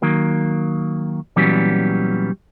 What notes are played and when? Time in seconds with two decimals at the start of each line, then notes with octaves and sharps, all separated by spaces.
0.02 D#3 F#3 A#3
1.36 A#2 E3 F#3 G3 B3 C#4